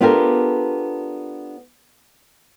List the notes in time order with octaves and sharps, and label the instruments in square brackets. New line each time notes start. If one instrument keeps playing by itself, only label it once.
[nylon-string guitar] B3 D4 F4 G4 A4 A#4